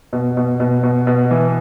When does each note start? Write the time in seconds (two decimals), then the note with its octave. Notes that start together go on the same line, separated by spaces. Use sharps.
0.13 B2
0.37 B2
0.60 B2
0.83 B2
1.07 B2
1.31 E3